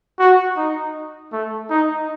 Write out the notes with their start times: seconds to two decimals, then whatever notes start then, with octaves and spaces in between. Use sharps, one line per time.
0.19 F#4
0.57 D#4
1.32 A3
1.70 D#4